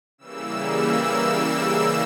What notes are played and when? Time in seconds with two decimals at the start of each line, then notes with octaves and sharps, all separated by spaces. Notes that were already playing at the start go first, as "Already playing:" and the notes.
0.18 C#3 E3 G3 A#3 E6
0.52 E6